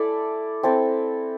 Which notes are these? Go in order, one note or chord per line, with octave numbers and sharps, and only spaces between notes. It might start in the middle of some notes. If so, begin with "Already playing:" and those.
Already playing: E4 A4 D5
C4 E4 A4 D5